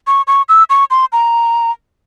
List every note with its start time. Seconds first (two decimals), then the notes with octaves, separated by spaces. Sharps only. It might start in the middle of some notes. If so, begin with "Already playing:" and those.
0.07 C#6
0.27 C#6
0.49 E6
0.70 C#6
0.91 C6
1.13 A#5